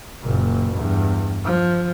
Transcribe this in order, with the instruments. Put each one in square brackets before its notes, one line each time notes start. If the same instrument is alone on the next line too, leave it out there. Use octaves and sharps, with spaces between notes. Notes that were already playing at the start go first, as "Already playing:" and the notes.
[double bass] F#1 A#2
E2 G2
F3